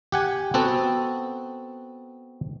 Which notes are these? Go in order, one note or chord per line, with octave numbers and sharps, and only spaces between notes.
G4 F#5 G#5
B3 C4 F#4 A4